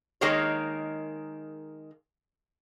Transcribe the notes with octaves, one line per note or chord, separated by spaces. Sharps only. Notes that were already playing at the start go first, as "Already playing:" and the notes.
D#3 G#3 A#3 G#4 A#4 C#5